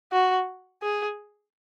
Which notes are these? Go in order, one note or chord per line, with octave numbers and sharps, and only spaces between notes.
F#4
G#4